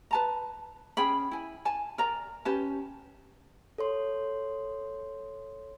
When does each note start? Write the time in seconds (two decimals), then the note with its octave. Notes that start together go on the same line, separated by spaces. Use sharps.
0.11 B4 A5 A#5
0.97 C#4 G#4 G5 B5
1.31 E4 G#5
1.65 G#5 A5
1.98 A#4 D5 A#5
2.45 C#4 G4 B4 A5
3.78 A4 C#5 C6